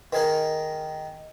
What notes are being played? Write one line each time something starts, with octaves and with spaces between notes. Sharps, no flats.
D#3 G#4 A#4